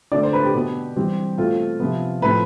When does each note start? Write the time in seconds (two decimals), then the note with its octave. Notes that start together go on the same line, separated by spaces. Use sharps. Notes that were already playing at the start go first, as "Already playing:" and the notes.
0.12 D3 A3 C4 D5
0.23 C5
0.33 B4
0.44 G4
0.54 B2 B3
0.96 E3 G3 C4
1.38 B2 A3 C4 F4
1.80 C3 F3 B3
2.22 A2 F3 C4 B4